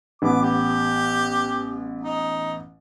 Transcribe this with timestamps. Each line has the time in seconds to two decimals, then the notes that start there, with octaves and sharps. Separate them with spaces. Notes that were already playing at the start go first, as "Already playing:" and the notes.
0.22 A1 B3 B4 D6
0.42 G4
2.01 D#4